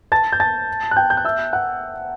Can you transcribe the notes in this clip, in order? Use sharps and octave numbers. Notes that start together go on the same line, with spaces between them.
A5 A6
G6
A5 A6
F#6
G5 G6
G6
F#6
E5 E6
F#5 F#6